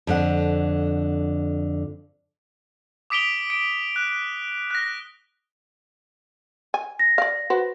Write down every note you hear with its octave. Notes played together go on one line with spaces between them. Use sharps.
F2 D3 F#5
D6 D#6 B6 D7 F7 G7
D7
F#6
F#6 A#6
G#5
A#6
D5 F5
F#4 B4 C5